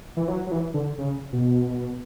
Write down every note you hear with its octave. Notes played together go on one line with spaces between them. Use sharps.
E3
F#3
F#3
E3
D3
C#3
B2